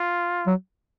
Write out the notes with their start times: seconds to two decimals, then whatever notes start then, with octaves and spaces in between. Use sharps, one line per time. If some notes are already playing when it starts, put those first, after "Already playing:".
Already playing: F4
0.47 F#3